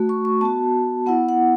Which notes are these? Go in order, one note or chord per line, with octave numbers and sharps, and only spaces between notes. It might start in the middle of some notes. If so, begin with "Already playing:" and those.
Already playing: A3 F#4
C#6
C#6
B3 F#4 A5
B3 E4 F#5
F#5